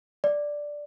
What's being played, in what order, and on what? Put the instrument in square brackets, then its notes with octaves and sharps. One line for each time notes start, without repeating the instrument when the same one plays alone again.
[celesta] D5